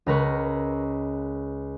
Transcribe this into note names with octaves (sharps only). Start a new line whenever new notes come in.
C#2 A#4 B4 C#6